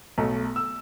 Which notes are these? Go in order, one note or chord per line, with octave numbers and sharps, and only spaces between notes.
B1 B2 A3
E6